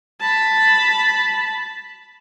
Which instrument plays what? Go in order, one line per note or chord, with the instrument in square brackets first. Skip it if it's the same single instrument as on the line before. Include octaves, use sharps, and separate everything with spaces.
[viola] A5 B5